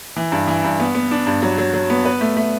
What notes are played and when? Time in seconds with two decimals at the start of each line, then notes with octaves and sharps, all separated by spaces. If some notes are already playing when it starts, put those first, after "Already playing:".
0.16 E3
0.32 G2
0.47 E3
0.64 G2
0.80 B3
0.95 B3
1.11 D4
1.27 G2
1.42 F#3
1.58 F#3
1.73 F#3
1.90 B3
2.05 B4
2.21 A3
2.37 A3